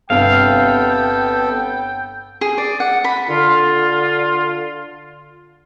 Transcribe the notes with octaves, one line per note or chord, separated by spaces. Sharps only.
G1 C3 B3 A4 F5 G5
G#4
D5
F#5
B5
D3 F4